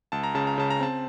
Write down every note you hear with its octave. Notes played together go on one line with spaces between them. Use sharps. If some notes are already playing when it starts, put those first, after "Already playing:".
C#2 A5
A#5
C#3 A5
A#5
C#3 A5
A#5
C4 A5